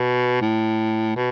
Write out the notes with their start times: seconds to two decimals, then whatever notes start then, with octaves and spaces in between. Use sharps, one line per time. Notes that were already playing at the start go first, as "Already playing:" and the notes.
Already playing: B2
0.41 A2
1.16 B2